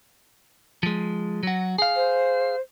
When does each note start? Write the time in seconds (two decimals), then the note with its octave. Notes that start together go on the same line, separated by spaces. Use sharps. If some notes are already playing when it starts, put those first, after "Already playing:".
0.83 F3 G#3
1.43 F#3 F#4
1.78 G#4 F5
1.95 C5